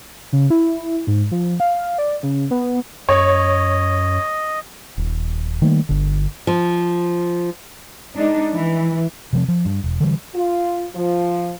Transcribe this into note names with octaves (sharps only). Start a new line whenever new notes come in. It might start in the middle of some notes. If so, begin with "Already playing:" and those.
C#3
E4
G#2
F3
F5
D5
C#3
B3
F#2 C#5 D#5
D#1
D#3 G3 A3 A#3
G1 D3
F3
G#3 D4 D#4
E3
C3 F3 C4
F3
G2
E1
D3 E3 G3
F4
F3